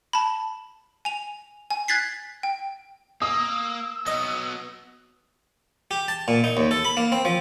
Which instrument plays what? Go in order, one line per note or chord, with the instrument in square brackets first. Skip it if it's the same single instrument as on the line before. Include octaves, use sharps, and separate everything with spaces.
[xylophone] A5 B5
G#5 F7
G#5
F#6 G#6 A6 B6 C7
G5
[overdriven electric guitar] A#3 [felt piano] D#6 [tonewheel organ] E6
[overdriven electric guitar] F#3 B3 [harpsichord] D#5
[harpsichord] G4
A5
A#2
D#4
D#2
A4
B5
A#3
C4
F3